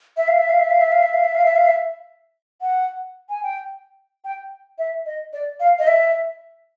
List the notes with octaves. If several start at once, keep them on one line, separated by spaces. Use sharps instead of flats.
E5
F5
E5
F5
E5
F5
E5
F5
E5
F5
E5
F5
E5
F5
E5
F#5
G#5
G5
G5
E5
D#5
D5
F5
D#5
E5